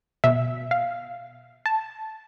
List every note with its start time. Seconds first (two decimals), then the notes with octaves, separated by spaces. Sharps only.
0.24 B2 E5
0.71 F5
1.66 A5